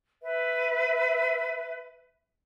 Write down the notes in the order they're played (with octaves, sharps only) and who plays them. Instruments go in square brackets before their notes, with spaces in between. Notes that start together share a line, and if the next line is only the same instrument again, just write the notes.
[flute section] B4 E5